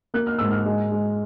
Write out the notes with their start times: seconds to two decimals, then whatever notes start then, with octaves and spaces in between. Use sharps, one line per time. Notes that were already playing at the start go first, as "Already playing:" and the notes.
0.14 A#3 F#6
0.27 F6
0.39 G#2 E6
0.51 F6
0.66 G#3
0.92 G#3